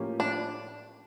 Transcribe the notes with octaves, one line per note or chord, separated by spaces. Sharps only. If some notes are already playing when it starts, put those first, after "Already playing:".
Already playing: A2 F3 A#3 C#4 G4
D4